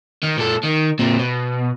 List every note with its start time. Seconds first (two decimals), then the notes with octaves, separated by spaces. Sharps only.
0.23 D#3
0.38 A#2 A4
0.64 D#3
0.99 A#2 C4
1.19 B2